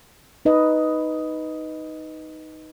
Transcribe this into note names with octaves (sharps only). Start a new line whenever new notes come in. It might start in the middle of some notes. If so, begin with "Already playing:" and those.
D#4 B4 D#5